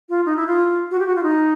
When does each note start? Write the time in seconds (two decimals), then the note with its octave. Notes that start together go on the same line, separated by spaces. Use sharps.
0.09 F4
0.26 D#4
0.37 E4
0.47 F4
0.91 F#4
1.00 G4
1.07 F#4
1.16 F4
1.23 D#4